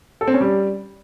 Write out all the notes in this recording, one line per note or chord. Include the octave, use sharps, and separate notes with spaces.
A4
C4
C#4
G3